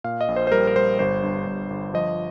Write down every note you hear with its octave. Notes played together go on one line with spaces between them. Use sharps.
A#2 F5
D#5
A#1
C5
C5
G3 A#4
A#4
G3 C5
G1 C5
G2
G1
G1
F3 D#5